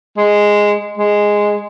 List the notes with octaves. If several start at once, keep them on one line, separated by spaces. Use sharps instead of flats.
G#3
G#3